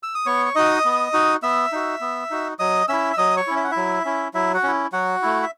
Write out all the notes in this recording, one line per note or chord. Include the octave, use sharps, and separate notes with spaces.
E6
D#6
B3 C#5 C#6
C#6
D#4 F#4 D#5 D#6
B3
D#4 F#4
B3 E5 E6
D#4 F#4
B3
D#4 F#4
F#3 D#5 D#6
C#4 E4 E5 E6
E6
F#3 D#5 D#6
C#5 C#6
C#4 E4
E5
F#5
E4 E5
F#3
C#4 E4
F#3 E4 E5
F#4 F#5
C#4 E4
F#3 F#4 F#5
A3 E4
E5